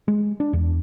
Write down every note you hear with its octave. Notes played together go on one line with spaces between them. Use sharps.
G#3
D4
E2